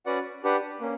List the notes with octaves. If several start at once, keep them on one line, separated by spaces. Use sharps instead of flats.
C#4 F#4 B4 D5 F#5
D4 G4 B4 F#5
A#3 C#4